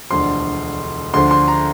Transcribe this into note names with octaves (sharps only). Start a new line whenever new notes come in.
E1 D2 D3 F3 C6
D2 D3 F3 C6
C6
A#5